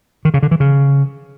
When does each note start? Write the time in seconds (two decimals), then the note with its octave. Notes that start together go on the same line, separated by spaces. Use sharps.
0.25 D#3
0.34 C#3
0.43 D3
0.51 E3
0.60 C#3